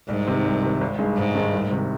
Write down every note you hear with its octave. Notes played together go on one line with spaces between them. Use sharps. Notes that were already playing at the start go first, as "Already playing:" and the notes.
C2 G#2
C3 D#3
C2
C3 D#3
G#1
G2 D#3 G#3
G#1 G#2
G2 D#3 G#3
C2
C3 D#3